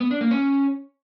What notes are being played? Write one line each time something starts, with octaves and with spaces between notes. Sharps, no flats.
B3
D4
A#3
C#4